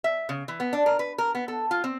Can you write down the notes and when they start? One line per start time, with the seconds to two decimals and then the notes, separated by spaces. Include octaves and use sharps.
0.04 E5
0.29 C#3
0.48 E3
0.60 B3
0.73 D4
0.86 A#4
0.99 B4
1.18 A#4
1.35 B3
1.48 A4
1.71 F4
1.84 C4